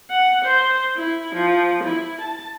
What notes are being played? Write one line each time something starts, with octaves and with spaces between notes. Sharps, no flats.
F#5
C5
E4
F3
E4
A5